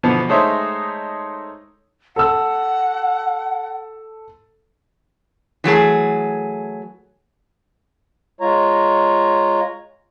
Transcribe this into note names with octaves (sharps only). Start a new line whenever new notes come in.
B2 D3 E3 F3 B3
G#3 A3 D#4 C5 C#5 E5
A4 F#5 E6
E3 F#3 A3 G#4
G#3 F4 C#5 A#5